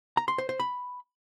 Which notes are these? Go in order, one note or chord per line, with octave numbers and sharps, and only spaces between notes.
A#5
C6
C5
C5
B5